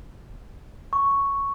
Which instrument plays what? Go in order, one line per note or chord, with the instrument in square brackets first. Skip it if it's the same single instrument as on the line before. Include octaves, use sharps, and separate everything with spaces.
[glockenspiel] C#6